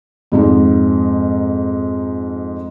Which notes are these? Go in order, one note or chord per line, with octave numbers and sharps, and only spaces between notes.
F2 G#2 D#4